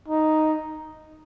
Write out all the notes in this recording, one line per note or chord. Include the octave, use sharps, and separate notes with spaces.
D#4